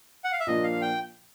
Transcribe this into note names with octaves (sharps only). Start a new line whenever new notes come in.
F#5
F5
E5
A#2 F3 A#3 D4 F4 D#5
F5
G5